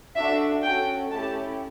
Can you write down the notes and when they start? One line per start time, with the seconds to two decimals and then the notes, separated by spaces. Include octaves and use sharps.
0.16 D4 F#4 A4 E5
0.63 C#4 F#4 A4 G5
1.10 A3 C#4 E4 G4 A5